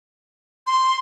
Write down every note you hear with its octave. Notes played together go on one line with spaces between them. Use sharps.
C6